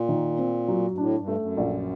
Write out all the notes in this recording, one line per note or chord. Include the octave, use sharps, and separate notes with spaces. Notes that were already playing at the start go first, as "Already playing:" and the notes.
Already playing: A#2
D#3
C4
F#3
G2
A2 D4
G2
A3
F#2
A#1